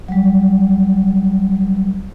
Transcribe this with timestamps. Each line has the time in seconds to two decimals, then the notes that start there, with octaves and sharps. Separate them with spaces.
0.08 F#3 G3